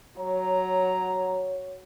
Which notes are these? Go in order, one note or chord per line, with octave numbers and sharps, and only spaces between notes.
F#3 C#5 A#5